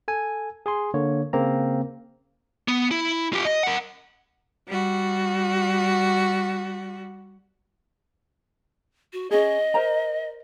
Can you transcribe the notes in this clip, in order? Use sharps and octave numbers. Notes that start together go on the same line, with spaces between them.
A4 G#5
G#4 G#5 C6
D3 A#3 C#5
C#3 A#3 C4 A#5
B3
E4
F4 G4
D#5
A#4 F#5
G3 F#4
F#4
C#4 G#4 D#5
A#4 C5 A#5